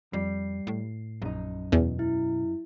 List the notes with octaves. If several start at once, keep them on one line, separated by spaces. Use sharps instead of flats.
F2 G3 C7
A2
A#1 F#2 D#4
E2 B2
E4